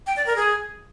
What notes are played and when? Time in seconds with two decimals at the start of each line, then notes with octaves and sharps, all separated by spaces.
0.07 G5
0.16 D5
0.26 A#4
0.36 G#4